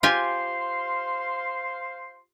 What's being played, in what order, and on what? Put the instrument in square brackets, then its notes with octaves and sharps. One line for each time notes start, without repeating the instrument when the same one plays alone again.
[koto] F4 G4 G#5 [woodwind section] C5 F5 C6